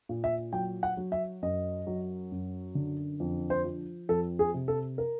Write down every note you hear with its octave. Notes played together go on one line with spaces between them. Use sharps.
A#2
E5
F#3 G5
F#5
F#3
E5
F#2 D#5
F#3
F#2
D3
F2
C5
F3
F2 A4
G#4
C3
A4
A#4